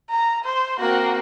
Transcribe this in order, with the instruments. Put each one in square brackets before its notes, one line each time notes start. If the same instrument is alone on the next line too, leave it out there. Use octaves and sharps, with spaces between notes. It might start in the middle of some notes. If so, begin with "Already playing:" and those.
[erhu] A#5
C5
[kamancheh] A#3 C4 [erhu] F#4